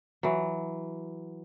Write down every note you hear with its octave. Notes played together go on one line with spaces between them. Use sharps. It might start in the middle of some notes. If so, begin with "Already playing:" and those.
E3 F#3